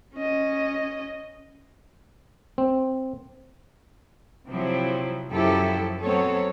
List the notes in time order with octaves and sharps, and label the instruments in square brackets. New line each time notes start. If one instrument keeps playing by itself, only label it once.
[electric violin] C#4 D#5
[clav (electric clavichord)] C4
[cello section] C3 F3 F#3 C4 E4
F#2 F3 F#3 E4 G4 A4
F#3 B3 C4 A4 C#5